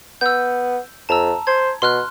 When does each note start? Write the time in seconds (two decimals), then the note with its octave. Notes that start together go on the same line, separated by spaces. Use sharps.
0.21 B3 E6 G6
1.09 F2 A5 A#5 E6
1.47 C5 G#6
1.82 B2 C6 F6 F#6